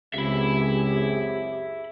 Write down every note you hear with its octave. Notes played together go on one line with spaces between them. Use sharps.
C#2 F#2 C4 G4 G#4 E5 B5